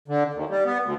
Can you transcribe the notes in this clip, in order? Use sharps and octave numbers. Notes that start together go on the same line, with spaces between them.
D3
D#2
G3
B3
D2